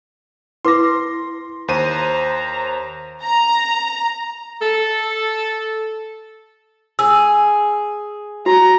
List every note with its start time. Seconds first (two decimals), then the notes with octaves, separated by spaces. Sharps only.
0.65 E4 B4 C6 D6 A#6
1.68 D#2 C5 A#5 D#7
3.22 A#5
4.61 A4
6.99 G#4 E6
8.46 F#4 A#5